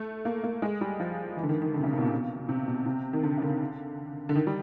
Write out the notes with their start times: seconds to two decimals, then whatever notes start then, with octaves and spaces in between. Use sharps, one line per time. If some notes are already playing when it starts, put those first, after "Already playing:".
Already playing: A3
0.25 A#3
0.44 A#3
0.62 G#3
0.81 G3
1.00 F3
1.37 E3
1.43 D3
1.49 D#3
1.62 D#3
1.74 D3
1.79 C3
1.83 C#3
1.93 C3
1.98 B2
2.02 A#2
2.11 B2
2.49 C3
2.68 B2
2.86 C3
3.13 D#3
3.23 D3
3.37 C#3
3.42 D3
4.29 D3
4.35 D#3
4.47 G3